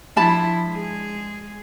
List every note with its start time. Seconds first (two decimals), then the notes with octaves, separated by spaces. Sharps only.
0.16 F3 D4 E4 A5 B5
0.68 G#3 G#4